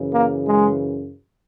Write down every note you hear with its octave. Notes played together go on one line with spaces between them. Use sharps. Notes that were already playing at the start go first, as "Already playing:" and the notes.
Already playing: F#2 C#3 E3
A#3
G#3